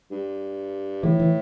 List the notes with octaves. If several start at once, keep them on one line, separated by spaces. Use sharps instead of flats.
G2
A2 E3
E3